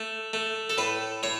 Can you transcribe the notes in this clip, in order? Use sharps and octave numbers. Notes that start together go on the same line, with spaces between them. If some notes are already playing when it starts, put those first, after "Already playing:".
Already playing: A3
A3
A4
A2 B4
A2 C#5